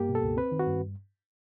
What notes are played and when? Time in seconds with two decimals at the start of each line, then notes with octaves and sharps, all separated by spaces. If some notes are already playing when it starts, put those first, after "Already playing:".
Already playing: G2 A#3 G4
0.09 B2
0.15 A4
0.22 C#2
0.37 C4 B4
0.52 D#3
0.59 F#4
0.67 G2